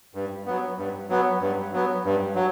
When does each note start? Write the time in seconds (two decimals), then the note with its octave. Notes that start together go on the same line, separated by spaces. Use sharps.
0.15 G2
0.46 F#3 B3
0.78 G2
1.10 F#3 B3
1.41 G2
1.73 F#3 B3
2.05 G2
2.35 F#3